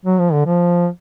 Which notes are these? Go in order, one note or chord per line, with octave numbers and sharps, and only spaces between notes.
F#3
F3
D3
F3